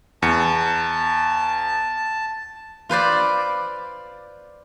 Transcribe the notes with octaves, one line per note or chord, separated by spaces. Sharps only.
E2 A5 C#7
F4 B4 C5 D5